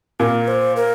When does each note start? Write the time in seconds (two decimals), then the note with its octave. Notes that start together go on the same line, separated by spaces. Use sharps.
0.20 A#2 A#4
0.48 C5
0.76 A#4